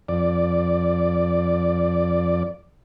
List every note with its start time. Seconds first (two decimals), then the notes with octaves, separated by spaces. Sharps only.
0.09 F2 D5